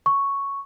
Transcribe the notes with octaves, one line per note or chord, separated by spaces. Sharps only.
C#6